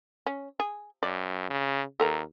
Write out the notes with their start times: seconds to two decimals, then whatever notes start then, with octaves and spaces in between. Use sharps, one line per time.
0.26 C#4
0.60 G#4
1.03 F#2 D5
1.50 C#3
2.00 D#2 A4 A#4 A#5